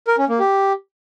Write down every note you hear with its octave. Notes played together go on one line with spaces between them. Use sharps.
A#4
C#4
A#3
G4